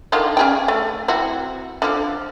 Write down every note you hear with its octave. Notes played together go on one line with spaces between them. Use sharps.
D3 D#3 F4
C#4 G#4 G5
A3
C4 E4 F#4
D3 F3